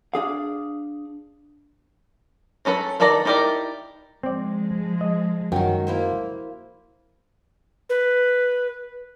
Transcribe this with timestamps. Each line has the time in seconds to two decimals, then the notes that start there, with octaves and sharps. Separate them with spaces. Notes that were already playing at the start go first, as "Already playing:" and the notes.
0.14 D4 G#4 F5
2.65 F#3 C#4 A4 B4
3.00 D#3 A4 B4 D5 A#5
3.25 D#4 E4 G4 A#4 D5
4.23 F3 G#3 C4 D5
5.01 D#5
5.52 F#2 D#3 F#3 G5
5.87 A#3 E4 C5
7.90 B4